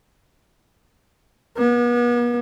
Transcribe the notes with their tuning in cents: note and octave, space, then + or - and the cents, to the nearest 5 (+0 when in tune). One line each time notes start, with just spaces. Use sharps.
B3 -40